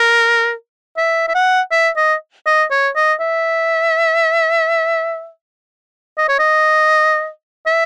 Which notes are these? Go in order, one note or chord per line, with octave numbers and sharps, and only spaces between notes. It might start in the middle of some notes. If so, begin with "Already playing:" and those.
Already playing: A#4
E5
E5
F#5
E5
D#5
D#5
C#5
D#5
E5
D#5
C#5
D#5
E5